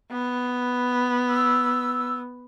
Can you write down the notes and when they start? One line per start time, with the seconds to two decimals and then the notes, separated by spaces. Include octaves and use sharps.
0.11 B3
1.29 E6